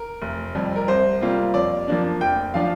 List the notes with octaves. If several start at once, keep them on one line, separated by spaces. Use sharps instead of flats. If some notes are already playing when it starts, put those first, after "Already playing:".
Already playing: A#4
F1
F2 C3 G3
A#4
C2 C5
C3 G3 A#3 F4
F2 D5
F3 A#3 D4
F1 G5
F3 D4 F4 F5